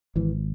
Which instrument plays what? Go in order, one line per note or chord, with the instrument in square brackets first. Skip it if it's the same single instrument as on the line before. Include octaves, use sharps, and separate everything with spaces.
[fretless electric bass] G#1 E3